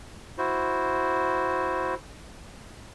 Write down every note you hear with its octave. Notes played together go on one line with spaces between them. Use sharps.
E4 F#4 C5